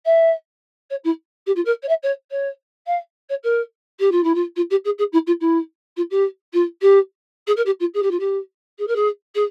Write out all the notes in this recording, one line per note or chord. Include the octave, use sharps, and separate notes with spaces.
E5
C#5
E4
G4
F4
A#4
C#5
E5
C#5
C#5
F5
C#5
A#4
G4
F4
E4
F4
F4
G4
G#4
G#4
E4
F4
E4
F4
G4
F4
G4
G#4
A#4
G4
F4
G#4
G4
F4
G4
G#4
A#4
G#4
G#4